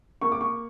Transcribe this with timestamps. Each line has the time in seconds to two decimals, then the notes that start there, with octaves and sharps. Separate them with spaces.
0.21 A#3 C#6
0.32 D6
0.41 C#6